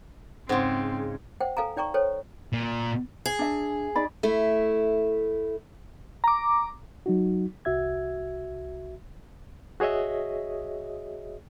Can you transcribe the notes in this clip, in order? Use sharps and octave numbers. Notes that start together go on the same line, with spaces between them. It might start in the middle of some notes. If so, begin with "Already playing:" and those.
G#2 C#3 C4 C5 F#5
C5 F#5 G5
A4 F5 G#5 A#5
D#4 D5 G5 A#5 C#6
A4 C5 C#5 G5
A#2
G#4
D4 E5
D#4 D5 B5
A3 E4
A#5 D6
F#3 D#4 F#4
C2 F#4 E5 G#6
F#4 G#4 C#5 D#5 E5